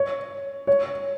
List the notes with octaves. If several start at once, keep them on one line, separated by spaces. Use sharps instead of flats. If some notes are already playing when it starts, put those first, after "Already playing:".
Already playing: C#5
C#5